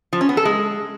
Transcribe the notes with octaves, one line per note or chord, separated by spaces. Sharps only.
F3
C#4
B3
A4
G#3